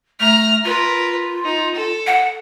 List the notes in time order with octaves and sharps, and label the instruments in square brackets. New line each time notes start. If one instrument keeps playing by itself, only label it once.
[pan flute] A3 [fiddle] A#5 F6
[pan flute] F4 [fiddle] A#4 B4
[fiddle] D#4
A4
[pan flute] F#5